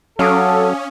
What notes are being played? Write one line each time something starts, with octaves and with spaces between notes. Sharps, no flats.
F#3 C#4 A4 F5 D6 D#6